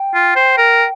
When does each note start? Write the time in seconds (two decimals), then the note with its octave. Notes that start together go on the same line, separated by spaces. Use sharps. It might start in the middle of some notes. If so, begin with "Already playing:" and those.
Already playing: G5
0.14 F4
0.36 C5
0.58 A#4